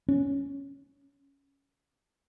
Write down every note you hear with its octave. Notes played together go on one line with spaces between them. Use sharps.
C#4